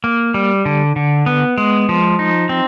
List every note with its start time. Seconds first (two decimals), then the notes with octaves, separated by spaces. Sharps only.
0.04 A#3
0.34 G3
0.65 D3
0.96 D3
1.26 B3
1.58 G#3
1.89 F3
2.19 D#4
2.49 C4